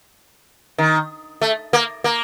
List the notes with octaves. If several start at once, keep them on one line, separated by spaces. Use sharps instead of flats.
D#3
A3
A#3
A#3